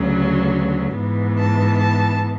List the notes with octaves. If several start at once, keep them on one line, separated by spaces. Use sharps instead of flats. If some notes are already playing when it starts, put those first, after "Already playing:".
Already playing: D2 C#3 F#3
G#2 E3 B3
A5
A5